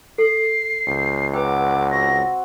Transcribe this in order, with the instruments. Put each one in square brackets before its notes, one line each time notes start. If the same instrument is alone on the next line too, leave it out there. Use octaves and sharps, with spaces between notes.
[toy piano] A4 [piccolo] C7
[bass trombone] C#2 [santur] G5
[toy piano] B4 G5 [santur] F#5 A#5 E6 [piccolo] D6
[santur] C4 F#4 [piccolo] A#6